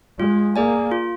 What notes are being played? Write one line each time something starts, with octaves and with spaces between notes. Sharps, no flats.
G#3 F4
A#3 G#4 D5 G#5
F4